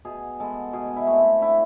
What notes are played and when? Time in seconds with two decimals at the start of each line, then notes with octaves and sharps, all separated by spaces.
0.05 B2 G#4
0.40 G#3 B3 A4
0.73 B2 G#4
0.96 E4
1.07 A3 C4
1.19 E4
1.41 D3 E4